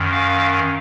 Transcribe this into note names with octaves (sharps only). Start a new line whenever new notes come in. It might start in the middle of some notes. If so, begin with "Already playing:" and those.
Already playing: F#2 D#3
F5